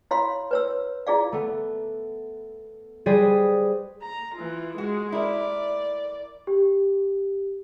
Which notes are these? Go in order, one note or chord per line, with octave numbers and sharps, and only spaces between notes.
E4 C#5 F5 B5 C6
B4 C#5 E6
E4 F4 G#4 D5 F5
A3 B3
G3 G#4 B4 C5 D5 D#5
A#5
E3 F4
G#3 F#4
E4 A#4 D5
G4